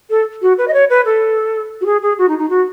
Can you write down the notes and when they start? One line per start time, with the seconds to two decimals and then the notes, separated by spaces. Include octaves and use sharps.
0.10 A4
0.41 F#4
0.58 B4
0.67 D#5
0.73 C#5
0.89 B4
1.05 A4
1.81 F#4
1.85 G#4
2.02 G#4
2.18 F#4
2.28 D#4
2.38 D#4
2.49 F#4